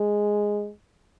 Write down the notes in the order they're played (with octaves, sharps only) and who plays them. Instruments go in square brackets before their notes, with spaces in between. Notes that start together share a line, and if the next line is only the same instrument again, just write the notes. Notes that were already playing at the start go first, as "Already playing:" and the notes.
Already playing: [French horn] G#3